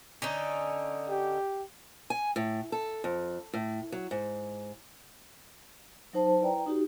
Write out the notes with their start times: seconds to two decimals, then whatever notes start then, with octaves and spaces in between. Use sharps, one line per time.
0.22 D3 C#4 D#4
1.10 G4
2.10 G#5
2.36 A2
2.72 A4
3.04 F2
3.54 A2
3.92 F#3
4.11 G#2
6.13 F#3 D#4 C5 A5
6.41 E4 B4 D5 G5 A#5
6.66 D#4 F#4 G4